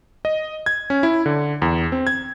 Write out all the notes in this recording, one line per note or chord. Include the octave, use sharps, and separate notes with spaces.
D#5
G#6
C#4
E4
D3
E2
C4
G#6